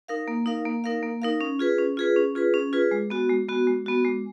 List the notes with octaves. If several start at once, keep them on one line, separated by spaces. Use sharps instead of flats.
D#4 A#4 F5
A#3
D#4 A#4 F5
A#3
D#4 A#4 F5
A#3
D#4 A#4 F5
C#4
F4 G#4 B4
C#4
F4 G#4 B4
C#4
F4 G#4 B4
C#4
F4 G#4 B4
G#3
B3 F#4
G#3
B3 F#4
G#3
B3 F#4
G#3